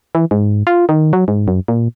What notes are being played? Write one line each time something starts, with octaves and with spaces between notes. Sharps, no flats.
E3
G#2
F4
D#3
F#3
G#2
F#2
A#2